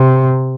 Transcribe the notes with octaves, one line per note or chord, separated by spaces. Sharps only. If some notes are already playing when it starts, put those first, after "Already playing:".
Already playing: C3